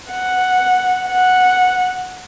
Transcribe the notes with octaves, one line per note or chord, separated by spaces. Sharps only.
F#5
F#5